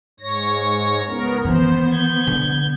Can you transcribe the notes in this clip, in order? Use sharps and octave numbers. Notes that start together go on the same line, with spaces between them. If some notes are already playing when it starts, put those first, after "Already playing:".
G#2 C#5 A#6
C#2 B3 A#4
D#3 E3 B3 C5
G6 G#6
D3